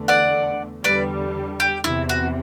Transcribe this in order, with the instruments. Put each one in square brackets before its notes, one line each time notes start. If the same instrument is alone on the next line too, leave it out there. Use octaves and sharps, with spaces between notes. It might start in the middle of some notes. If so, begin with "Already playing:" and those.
Already playing: [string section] E2 D3 A3
[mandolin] D5 F#5
[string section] E2 D3 G3 [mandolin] B4 D5
[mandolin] G4
[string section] E2 C3 E3 [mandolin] E4
[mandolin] F#4